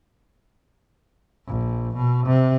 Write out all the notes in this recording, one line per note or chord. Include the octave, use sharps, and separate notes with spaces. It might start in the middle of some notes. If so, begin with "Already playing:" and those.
A#1
B2
C3